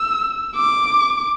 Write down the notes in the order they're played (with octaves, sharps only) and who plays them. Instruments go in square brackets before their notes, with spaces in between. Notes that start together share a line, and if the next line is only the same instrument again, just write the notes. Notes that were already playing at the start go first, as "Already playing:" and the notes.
Already playing: [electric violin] E6
D6